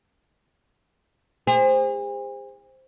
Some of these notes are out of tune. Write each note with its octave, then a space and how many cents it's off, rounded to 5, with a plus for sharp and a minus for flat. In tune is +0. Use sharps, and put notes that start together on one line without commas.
G#4 -45 C5 +0